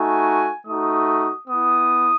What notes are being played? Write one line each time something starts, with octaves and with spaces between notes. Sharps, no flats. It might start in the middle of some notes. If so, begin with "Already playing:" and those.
Already playing: A3 D#4 F#4 G#5
A3 D#4 F#4 D#6
B3 E4 D#6